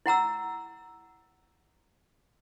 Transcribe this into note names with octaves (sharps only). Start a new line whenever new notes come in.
E4 F#5 A#5 E6